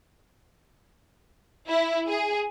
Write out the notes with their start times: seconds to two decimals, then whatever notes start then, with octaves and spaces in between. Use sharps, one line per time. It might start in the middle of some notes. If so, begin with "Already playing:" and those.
1.69 E4
2.08 G#4